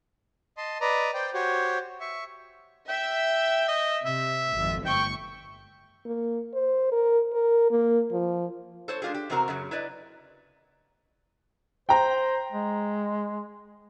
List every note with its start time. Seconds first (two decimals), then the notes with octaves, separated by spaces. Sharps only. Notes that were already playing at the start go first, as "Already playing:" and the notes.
0.57 D#5 A5 C6
0.81 B4 D5 D#5 A#5
1.14 C5 D5 G5
1.34 F#4 G4 C5 C#5
2.01 E5 C#6
2.89 E5 G5
3.68 D#5
4.05 C3 E5
4.56 G#1 F2
4.85 G1 G5 C#6
6.06 A#3
6.54 C5
6.92 A#4
7.33 A#4
7.70 A#3
8.12 F3
8.88 A4 C5 C#5
9.02 G#3 D4 F4 G4 G#4
9.14 G4
9.30 E2 C3 C4 F#4 A#4 A#5
9.48 F#2 C#3 F#3
9.71 E4 B4 D5 D#5
11.89 C5 G5 A#5
12.52 G#3